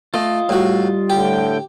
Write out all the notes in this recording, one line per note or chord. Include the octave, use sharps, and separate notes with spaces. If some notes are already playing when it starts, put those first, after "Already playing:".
A3 F4 D#5
A2 G3 F#4
A2 D3 G4 G5